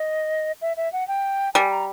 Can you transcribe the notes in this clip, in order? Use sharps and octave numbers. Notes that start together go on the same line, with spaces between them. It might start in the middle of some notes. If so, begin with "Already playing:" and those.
Already playing: D#5
E5
E5
F#5
G5
G3 G#5
A#5